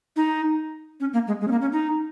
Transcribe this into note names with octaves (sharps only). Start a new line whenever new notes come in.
D#4
C#4
A#3
G#3
G#3
C#4
A#3
C#4
D#4